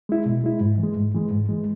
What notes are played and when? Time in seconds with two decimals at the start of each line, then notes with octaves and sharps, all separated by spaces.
0.09 G#3 E4
0.26 B2
0.44 G#3 E4
0.61 G#2
0.78 E3
0.83 G#3
0.96 G#2
1.15 E3 G#3
1.31 G#2
1.49 E3 G#3